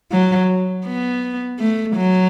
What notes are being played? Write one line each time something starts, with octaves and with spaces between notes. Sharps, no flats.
F#3
B3
A3
F#3